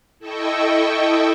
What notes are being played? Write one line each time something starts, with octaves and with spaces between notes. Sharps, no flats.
E4 A4 D#5 E5 G5 C#6